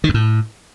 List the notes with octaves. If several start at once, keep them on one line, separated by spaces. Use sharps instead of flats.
D#3
F#2
A2